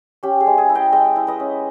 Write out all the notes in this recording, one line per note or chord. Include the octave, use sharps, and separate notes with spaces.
C#4 G4
G#4
G#3
G#4
E4
D#5 G5
G#3 D#5 G5
E4
B4 D#5
C#4